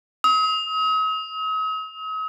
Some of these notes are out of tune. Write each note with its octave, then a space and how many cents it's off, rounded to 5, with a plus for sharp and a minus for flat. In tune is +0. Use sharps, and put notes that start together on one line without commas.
D#6 +45